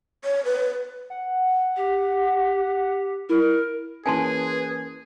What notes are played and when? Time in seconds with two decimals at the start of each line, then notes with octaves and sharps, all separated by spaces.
0.24 C#5
0.45 B4
1.10 F#5
1.77 G4
3.29 E4 A#4
4.06 E3 A#3 C#4 G#4 B4 G#5 A5 C6